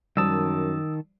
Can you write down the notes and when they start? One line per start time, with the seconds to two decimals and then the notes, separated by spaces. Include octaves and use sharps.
0.17 F#2 D#3 F3 G3 A5 D#6 E6